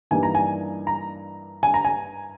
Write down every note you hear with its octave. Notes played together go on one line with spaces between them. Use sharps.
G2 E3 G3 A#3 D#4 G#5
A#5
G#5
A#5
G#5
A#5
G#5